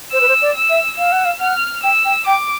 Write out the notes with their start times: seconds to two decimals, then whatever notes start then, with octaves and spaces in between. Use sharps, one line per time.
0.12 C5 E6
0.21 B4
0.28 C5
0.42 D5
0.55 E6
0.69 E5
0.98 F5 E6
1.12 F#5
1.25 F5
1.40 F#5 F6
1.83 G5 E6
2.05 G5
2.26 G5 D6